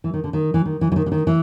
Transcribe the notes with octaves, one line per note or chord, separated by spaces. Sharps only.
E3
D#3
D3
D#3
E3
D#3
E3
E3
D#3
D3
D#3
E3